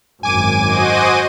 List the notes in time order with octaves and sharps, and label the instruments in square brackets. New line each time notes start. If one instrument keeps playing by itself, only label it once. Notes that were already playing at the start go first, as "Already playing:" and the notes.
[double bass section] G#1 F#2 [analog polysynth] G#5 D6 D#7
[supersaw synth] F#4 C5 D#5